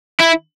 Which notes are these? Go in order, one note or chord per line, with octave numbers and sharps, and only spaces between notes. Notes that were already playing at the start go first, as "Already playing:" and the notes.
E4